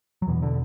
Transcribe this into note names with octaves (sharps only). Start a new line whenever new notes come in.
F#3
E2 B2 E3
D3